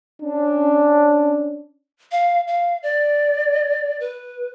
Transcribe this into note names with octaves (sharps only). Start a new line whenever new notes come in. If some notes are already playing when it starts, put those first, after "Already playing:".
C#4 D4
F5
F5
D5
B4